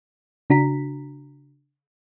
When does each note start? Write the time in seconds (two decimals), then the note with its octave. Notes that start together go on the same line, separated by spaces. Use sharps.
0.50 C#3 D4 F#4 A#5 B6